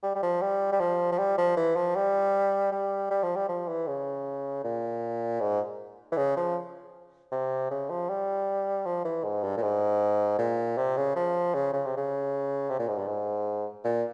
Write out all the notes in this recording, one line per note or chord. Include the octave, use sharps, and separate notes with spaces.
G3
G3
F3
G3
G3
F3
F3
G3
F3
E3
F3
G3
G3
G3
F3
G3
F3
E3
C#3
A#2
G#2
E3
C#3
F3
C3
C#3
F3
G3
F3
E3
G#2
G2
A#2
G#2
A#2
C3
C#3
F3
C#3
C#3
C3
C#3
C3
A#2
G#2
G2
G#2
A#2